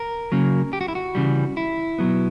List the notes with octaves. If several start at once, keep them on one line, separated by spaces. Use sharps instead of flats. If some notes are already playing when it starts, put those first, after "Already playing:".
Already playing: A#4
C#3 F#3 A#3
G4
F#4
E4
F#4
C#3 E3 G3
E4
B2 F#3 B3